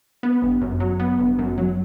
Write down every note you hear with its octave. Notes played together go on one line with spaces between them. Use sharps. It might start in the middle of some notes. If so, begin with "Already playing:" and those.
B3
G1
F#2
F#3
B3
G1
F#2
F#3